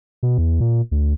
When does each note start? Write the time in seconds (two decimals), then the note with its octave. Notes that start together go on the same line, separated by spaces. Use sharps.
0.23 B2
0.38 E2
0.60 A#2
0.91 D2